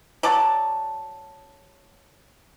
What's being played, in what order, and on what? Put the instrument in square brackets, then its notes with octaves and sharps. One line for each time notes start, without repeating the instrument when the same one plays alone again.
[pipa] F#3 D5 A5